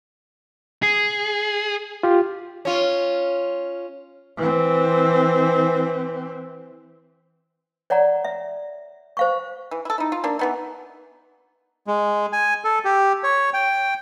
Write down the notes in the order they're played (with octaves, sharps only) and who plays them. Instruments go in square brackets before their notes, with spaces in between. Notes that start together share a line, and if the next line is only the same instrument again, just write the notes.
[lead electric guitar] G#4
[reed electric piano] F4 G4
[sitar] C#4 F4
[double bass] E3 C4
[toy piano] C#5 D5 F#5 A#5
E5
C5 F5 C#6
[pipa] E3
E4 A4
D#4 E4
F4
A#3 D4
E3 B3 D#4
[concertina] G#3
G#5
A4
G4
C#5
G5